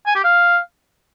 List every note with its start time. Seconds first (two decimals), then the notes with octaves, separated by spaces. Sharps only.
0.06 G#5
0.15 G4
0.24 F5